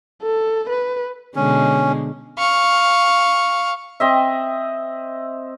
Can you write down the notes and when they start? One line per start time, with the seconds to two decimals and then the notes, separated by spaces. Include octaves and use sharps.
0.23 A4
0.70 B4
1.36 B2 D3 G#3 C#4
2.38 F5 C#6
4.00 C4 D#5 E5